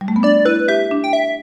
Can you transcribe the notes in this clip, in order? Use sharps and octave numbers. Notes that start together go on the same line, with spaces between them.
G3
A3
B3
D4 D5
E4 B4
G4 E5
D4
G5
E5